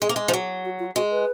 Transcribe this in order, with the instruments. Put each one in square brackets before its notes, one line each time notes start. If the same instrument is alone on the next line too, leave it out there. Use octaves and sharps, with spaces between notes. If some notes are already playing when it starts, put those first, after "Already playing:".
[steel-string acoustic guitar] G#3 [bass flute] G#4
[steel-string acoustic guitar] A#3
G#3
F3
[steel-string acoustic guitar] F#3 [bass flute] F#4
[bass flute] F#4
F4
[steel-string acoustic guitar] G#3 [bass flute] F#4
[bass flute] B4